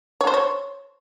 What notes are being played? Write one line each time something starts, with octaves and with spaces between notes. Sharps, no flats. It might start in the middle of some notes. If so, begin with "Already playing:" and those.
C#5
C5
C#5